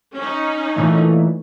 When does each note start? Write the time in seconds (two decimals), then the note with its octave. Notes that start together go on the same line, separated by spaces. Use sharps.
0.16 C#4 D#4
0.75 A#2 E3 A3